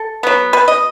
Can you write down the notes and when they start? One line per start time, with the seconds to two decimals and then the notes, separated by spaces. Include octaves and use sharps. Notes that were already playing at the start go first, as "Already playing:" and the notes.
Already playing: A4
0.23 F#3 B3
0.53 B2 B4
0.68 D#5